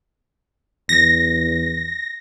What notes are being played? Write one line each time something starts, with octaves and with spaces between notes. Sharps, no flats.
E2 A#6